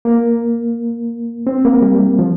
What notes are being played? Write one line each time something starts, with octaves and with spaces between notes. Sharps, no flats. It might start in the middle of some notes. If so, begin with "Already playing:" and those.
A#3
C4
A#3
G3
F3